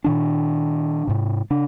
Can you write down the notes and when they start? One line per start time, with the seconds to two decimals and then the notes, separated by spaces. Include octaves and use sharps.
0.04 A#2 D#3 D4
1.07 G#2 C3
1.50 C#3 D4